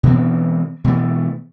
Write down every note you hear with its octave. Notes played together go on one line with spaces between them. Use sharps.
B2 E3 B3 C4
B2 E3 A3